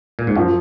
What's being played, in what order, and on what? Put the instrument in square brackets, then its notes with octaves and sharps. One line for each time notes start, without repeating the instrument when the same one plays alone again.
[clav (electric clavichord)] A#2
G#2
[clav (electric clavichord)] F#2 [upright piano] F3